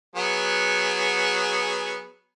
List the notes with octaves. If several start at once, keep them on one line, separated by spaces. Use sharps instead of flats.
F#3 B3 G#4